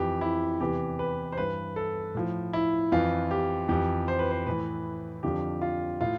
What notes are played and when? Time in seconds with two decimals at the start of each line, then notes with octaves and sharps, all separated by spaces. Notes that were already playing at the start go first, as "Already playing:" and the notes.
Already playing: F2 E3 G4
0.21 E4
0.60 E2 C3 E3 G4
0.99 B4
1.32 C5
1.37 G2 E3 B4
1.76 A4
2.15 A2 F3
2.53 E4
2.92 F2 E3 F4
3.31 G4
3.69 F2 E3 G4
4.08 C5
4.19 B4
4.31 C5
4.46 A2 E3 B4
5.23 F2 D3 F3 G4
5.62 F4
6.01 A2 F4